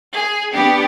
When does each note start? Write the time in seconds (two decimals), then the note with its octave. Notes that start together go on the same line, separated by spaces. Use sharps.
0.12 G#4
0.53 B3 D4 G4